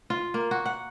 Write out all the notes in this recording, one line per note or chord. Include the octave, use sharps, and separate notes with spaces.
F4
A#3
F#4
F#5